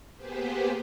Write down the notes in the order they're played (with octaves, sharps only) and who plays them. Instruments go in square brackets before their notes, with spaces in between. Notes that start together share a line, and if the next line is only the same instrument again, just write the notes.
[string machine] A#3 B3 G4 G#4 B4 C5